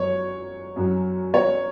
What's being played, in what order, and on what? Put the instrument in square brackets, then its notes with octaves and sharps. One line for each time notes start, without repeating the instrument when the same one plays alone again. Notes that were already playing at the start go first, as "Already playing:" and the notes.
Already playing: [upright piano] F#2 F#3 C#5
F#2 F#3
C#5